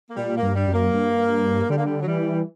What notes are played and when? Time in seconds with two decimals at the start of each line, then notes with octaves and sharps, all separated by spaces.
0.10 A#3
0.16 A#2 G3
0.36 A#3
0.42 G2
0.55 G3
0.67 F#2
0.74 A#3
0.93 G2
1.69 D3 G3
1.77 A#3
1.86 G3
2.02 F#3
2.07 E3 G3